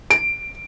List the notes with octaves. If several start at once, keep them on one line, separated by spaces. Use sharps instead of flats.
D7